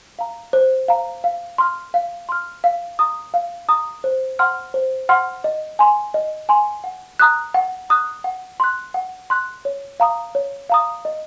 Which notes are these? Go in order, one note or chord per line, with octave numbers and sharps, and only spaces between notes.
F5 A#5
C5
F5 A#5
F5
C6 F6
F5
C6 F6
F5
A#5 D#6
F5
A#5 D#6
C5
F#5 C6 F6
C5
F#5 C6 F6
D#5
G#5 C6
D#5
G#5 C6
F#5
A#5 D#6 F#6
F#5
A#5 D#6 F#6
F#5
C6 F#6
F#5
C6 F#6
C#5
F5 A#5 D#6
C#5
F5 A#5 D#6
D#5